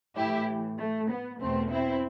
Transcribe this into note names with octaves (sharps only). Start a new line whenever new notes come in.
A2 E4 G4
E3
A3
B3
E2 B2 A3 C4
C4 E4